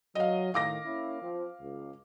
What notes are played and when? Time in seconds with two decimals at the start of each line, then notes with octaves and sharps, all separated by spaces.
0.15 F#3 D#5 F5
0.54 A2 D#3 F5 D6 A#6
0.85 A#3 C#4 E4
1.22 F3 C4
1.61 C#2